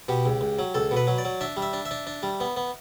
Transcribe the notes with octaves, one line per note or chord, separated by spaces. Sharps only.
B2 G4
C#2
C#2
F#3
C#2 A4
B2
B4
F#3
D5
F#3
D4 E5
G3
E5
D4
E5
D4
D4
G3
B3
B3